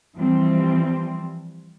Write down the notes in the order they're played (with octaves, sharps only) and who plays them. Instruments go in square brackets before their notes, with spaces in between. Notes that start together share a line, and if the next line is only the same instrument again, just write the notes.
[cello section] E3 F3 G3 C4